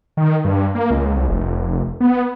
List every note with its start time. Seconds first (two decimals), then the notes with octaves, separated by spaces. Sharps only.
0.17 D#3
0.45 G2
0.75 A#3
0.91 C#2
1.16 C2
1.29 F1
2.00 B3